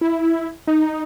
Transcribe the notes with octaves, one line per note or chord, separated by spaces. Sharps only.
E4
D#4